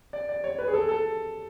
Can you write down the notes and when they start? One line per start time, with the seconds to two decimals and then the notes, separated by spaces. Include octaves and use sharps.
0.13 D5
0.29 D5
0.44 C#5
0.59 B4
0.68 G#4
0.74 A4
0.89 A4